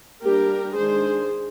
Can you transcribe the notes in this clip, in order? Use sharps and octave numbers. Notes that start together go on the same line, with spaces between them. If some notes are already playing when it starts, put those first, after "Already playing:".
G3 A#3 D4 G4 A#4
D#3 G#3 D4 G#4 C5